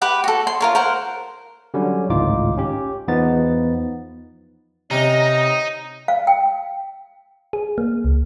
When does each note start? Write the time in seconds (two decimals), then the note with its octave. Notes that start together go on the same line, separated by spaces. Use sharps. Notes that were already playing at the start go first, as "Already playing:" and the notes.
0.02 G4 B4 F#5
0.24 F#4 A4
0.47 C6
0.60 F4 A#4 C#5
0.75 A#4 C5 F#5
1.74 D3 F#3 G3 C#4
2.09 G#1 C#2 A2 D#4 F4 D6
2.57 C#4 G4
3.08 E2 F3 B3 D#4 A6
4.91 C3 C#4 D#4 D#5 A#5
6.08 F5
6.27 G5
7.53 G#4
7.78 A#3
8.04 C#2